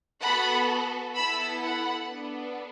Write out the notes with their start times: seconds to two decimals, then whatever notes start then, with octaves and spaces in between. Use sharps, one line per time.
0.23 B3 F#4 A4 F#5 B5
1.16 B3 E4 A4 B5 E6
1.62 F#5 B5
2.09 B3 D4 A4